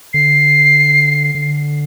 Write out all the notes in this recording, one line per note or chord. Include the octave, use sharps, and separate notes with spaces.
D3 C7
D3